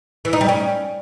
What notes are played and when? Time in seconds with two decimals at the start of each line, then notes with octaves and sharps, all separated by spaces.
0.25 E3
0.33 D#4
0.41 G3
0.49 C#4